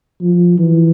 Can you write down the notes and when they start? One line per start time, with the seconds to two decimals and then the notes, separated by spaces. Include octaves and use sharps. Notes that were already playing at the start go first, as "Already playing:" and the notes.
0.21 F3
0.58 E3